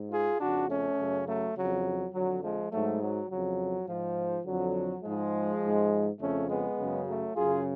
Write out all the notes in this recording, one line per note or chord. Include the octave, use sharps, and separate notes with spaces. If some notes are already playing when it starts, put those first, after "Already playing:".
Already playing: G#2
F4 G#4
F2 C#3 D4 F#4
A3 C#4
F#2 C#3
F#3 A3
F2 C#3 F#3
F2 D3 F#3
F3 G#3
G#2 F#3 A3
F#3
F2 C#3 F#3
G#2 F3
F2 D3 F#3
G#2 F3 G#3
G#2
F2 C#3 A3 C#4
G#3 B3
F#2 C#3
F#3 A3
F#2 C#3 F4 G#4